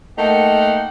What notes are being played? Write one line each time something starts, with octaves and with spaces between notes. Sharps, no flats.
A3 A#3 D#4 F#5 G5